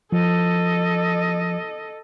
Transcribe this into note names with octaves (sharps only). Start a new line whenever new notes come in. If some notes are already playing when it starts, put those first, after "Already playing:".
F3 A4 D#5